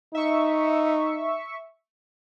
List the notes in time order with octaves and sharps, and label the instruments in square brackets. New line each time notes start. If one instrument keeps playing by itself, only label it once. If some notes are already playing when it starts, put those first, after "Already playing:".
[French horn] D#4 [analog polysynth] E5 C#6